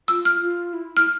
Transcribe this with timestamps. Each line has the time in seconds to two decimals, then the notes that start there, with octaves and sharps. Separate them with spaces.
0.08 F4 E6
0.25 F6
0.41 F4
0.73 E4
0.97 E4 F6